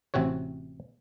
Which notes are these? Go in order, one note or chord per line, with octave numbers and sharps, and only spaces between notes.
A1 C3 C4 F#4 C#5